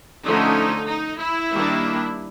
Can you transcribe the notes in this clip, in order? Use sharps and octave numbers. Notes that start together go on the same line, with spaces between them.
D3 F3 A3 C#4 D#4
D#4
E4
D#3 G3 A#3 D4